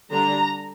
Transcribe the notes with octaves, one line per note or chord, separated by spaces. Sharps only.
D3 G3 D4 A#5